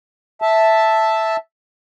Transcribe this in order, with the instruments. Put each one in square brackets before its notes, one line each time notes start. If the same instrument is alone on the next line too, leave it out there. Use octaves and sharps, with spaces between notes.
[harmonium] E5 A5